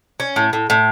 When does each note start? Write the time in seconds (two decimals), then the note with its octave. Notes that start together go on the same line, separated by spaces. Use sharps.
0.20 C#4
0.36 A2
0.53 A2
0.70 A2